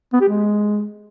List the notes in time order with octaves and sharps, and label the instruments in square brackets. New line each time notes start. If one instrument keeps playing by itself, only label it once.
[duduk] B3
G4
G#3